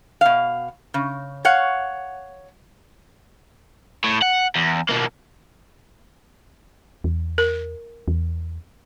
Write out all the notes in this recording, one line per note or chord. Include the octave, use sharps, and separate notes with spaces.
B2 F5
C#3
C#5 F5 F#5
A2
F#5
E2
B2 A#3
E2
A#4
E2